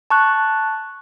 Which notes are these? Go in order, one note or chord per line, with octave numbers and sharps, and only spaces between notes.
A5 C#6 F#6